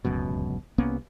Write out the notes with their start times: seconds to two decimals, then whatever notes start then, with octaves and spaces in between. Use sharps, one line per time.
0.05 D1 C#2 F#2 B2
0.78 C2 A#3 B3 C#4